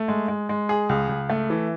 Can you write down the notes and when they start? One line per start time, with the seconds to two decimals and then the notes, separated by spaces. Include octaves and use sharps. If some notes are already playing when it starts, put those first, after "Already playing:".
Already playing: A3
0.08 G#3
0.28 G#3
0.49 G#3
0.69 G#4
0.89 C#2
1.09 C#2
1.30 A3
1.50 E3